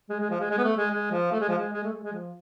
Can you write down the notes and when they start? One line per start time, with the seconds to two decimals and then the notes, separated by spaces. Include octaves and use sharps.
0.09 G#3
0.20 G#3
0.30 F3
0.40 G#3
0.50 G#3
0.58 B3
0.64 A3
0.77 G#3
0.91 G#3
1.11 F3
1.32 A3
1.40 G#3
1.49 F3
1.58 G#3
1.73 G#3
1.83 A3
1.93 G#3
2.03 G#3
2.13 F3